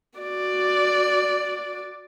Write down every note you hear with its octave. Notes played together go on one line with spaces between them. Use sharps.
F#4 D5